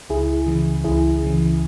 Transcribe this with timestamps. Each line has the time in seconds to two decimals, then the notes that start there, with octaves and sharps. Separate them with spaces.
0.10 C#2 E4 G#4
0.47 C#3 E3
0.84 C#2 E4 G#4
1.22 C#3 E3